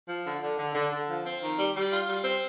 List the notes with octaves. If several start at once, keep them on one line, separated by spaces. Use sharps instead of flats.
F3
D3
D3
D3
D3
D3
F3
C4
D#3
G3
G3
F4
G3
C4